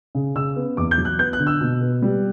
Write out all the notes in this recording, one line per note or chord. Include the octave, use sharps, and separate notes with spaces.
C#3
C#3 E6
B3
E2 D6
G6
F#3
F#6
B3 G6
F#6
D3
E6
B2
B3
G3